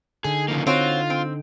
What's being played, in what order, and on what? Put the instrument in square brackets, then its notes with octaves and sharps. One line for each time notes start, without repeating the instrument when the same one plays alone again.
[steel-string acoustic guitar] D3 D#4 [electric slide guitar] G#4
[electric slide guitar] C#3 F3 A#3
[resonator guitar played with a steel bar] C4 F#4 C#5 [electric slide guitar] F4
[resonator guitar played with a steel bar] C4